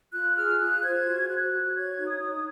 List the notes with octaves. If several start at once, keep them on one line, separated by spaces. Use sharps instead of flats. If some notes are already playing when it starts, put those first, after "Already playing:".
F4 F#6
G#4 F6
F4 F#6
C5 G#6
F#4
F#4 F#6
F#4
C#5 G#6
D#4
D#6
D#4